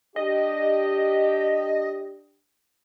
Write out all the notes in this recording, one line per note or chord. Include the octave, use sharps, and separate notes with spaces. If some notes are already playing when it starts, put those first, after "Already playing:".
D4 G4 D#5